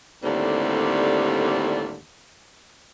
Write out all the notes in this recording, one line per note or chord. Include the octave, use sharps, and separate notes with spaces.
D#2 A2 D3 G3 C4